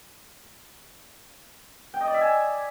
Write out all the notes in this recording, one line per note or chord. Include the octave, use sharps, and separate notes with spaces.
G5
D#5
D5
E5
G#5